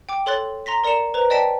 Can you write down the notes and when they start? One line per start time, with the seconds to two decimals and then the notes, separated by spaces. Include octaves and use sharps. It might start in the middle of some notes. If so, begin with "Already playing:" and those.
0.09 G5 D6
0.26 A4 C#5 C6 F#6 A6
0.66 A#5 C6 A#6 B6
0.84 A#4 D5 A#5 C#7 E7
1.14 B4 C5 A#5
1.30 D5 D#5 G5 A5 B6 D7